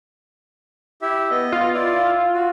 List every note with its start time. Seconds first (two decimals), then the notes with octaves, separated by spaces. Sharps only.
1.02 E4 G4 E5
1.31 B3 D#5
1.52 F4
1.74 E4 D5
2.34 F#4